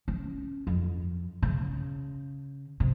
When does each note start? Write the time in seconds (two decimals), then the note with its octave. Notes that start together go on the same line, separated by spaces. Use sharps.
0.08 C#4
0.67 F2
1.42 C#3
2.80 C3